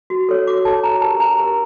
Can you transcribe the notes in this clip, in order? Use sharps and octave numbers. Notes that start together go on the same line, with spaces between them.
F#4
A4 C#5
F#4 D6
A4 C#5 A5
D4 A#5
G4 A#4 A5
D4 A#5
G4 A#4